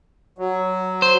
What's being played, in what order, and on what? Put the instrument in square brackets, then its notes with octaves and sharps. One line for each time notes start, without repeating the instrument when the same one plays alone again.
[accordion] F#3
[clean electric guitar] C5